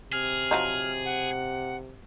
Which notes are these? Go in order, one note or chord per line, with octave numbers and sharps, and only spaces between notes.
C3 G#4 F6
F3 F#3 D#4
F#5